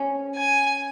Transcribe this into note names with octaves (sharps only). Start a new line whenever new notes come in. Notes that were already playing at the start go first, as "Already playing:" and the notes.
Already playing: C#4
G#5